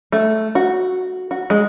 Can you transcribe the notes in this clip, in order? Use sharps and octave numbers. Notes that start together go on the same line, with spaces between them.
A3
F#4
F#4
G#3